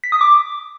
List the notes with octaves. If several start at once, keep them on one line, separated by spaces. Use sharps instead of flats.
B6
D#6
D6